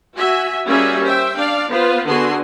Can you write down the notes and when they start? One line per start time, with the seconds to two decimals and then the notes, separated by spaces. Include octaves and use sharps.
0.14 F#4 E5 G#5
0.66 G3 A#3 C#4 F#4 G#4 E5
1.04 C5 E5 G5
1.35 D4 D5 F5
1.69 B3 F4 B4 C5
2.07 D3 B3 F#4 G#4 C6